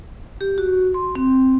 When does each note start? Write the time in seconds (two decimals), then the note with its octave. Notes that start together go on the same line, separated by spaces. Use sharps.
0.41 G4
0.58 F#4
0.94 C6
1.15 C4